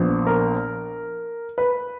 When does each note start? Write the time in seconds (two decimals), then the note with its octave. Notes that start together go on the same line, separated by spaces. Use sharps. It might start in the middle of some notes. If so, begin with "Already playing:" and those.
Already playing: A#1 A#2 F3 B3
0.27 A#4
1.58 B4